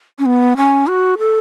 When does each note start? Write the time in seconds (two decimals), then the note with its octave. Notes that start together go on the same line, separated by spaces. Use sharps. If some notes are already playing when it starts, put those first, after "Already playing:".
0.19 C#4
0.26 B3
0.57 C#4
0.87 F#4
1.18 A4